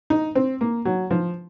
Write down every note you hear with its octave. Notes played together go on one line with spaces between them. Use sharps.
D#4
C4
A#3
F#3
F3